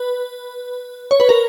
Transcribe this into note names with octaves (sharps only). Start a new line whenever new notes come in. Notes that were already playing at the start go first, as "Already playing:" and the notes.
Already playing: B4
C#5
B4
A#4